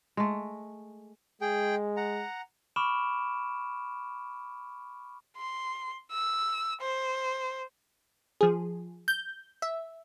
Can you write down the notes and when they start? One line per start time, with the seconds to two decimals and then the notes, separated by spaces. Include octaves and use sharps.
0.17 G#3 A3
1.41 G#3 G#4 G5
1.97 F#5 A#5
2.76 B5 C#6 D6 F6 D7 E7
5.37 C6
6.11 E6
6.81 C5
8.41 F3 G#4
9.08 G6
9.62 E5